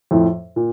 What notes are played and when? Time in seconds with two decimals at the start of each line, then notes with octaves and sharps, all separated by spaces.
0.11 F2 A2
0.56 A#2